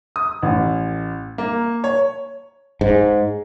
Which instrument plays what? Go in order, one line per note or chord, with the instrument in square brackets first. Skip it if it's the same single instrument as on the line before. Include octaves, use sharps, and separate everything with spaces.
[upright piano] D#6
A1
A#3
C#5
[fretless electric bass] G#2